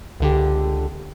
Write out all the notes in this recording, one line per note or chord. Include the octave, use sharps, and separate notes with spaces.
C#2 D3 G4